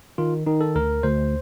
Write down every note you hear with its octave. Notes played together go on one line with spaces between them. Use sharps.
D#3 F4
D#3 D#4
A4
D2 A#4
D2 C5